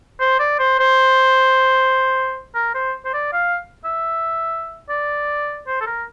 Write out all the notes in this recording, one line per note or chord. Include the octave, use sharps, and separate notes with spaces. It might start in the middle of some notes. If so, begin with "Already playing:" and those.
C5
D5
C5
C5
A#4
C5
C5
D5
F5
E5
D5
C5
A4
A#4